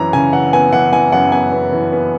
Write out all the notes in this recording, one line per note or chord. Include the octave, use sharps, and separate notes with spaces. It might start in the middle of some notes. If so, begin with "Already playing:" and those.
Already playing: F#2 E3 A#5
C#3 G#5
E3 F#5
B3 G#5
E3 F#5
E3 G#5
F#2 F#5
B3 G#5
B3
E3
B3